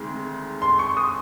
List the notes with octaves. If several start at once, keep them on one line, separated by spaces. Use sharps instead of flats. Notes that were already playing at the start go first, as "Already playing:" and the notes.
Already playing: D2 C3 D#3 G#3
C6
C#6
D#6